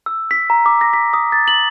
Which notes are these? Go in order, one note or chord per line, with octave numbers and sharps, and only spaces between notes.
E6
B6
A#5
D6
A#6
B6
D#6
A6
F#7